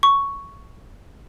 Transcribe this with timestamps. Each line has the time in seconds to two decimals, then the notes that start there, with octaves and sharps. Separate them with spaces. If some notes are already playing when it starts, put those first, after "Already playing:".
0.03 C#6